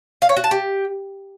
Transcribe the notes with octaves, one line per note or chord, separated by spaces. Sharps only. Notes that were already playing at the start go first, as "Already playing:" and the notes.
F5
C#5
F#4
A5
G4